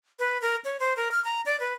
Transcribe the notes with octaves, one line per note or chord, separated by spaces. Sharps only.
B4
A#4
C#5
C5
A#4
F6
A#5
D5
B4